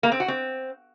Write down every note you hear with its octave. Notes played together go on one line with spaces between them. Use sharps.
A#3
C4
F#4
C4